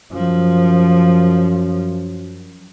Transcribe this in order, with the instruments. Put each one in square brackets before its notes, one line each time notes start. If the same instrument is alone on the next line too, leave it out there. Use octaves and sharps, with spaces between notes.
[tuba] F#2 [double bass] F3